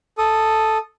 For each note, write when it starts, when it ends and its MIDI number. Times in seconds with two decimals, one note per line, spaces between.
0.18 0.78 69
0.18 0.78 87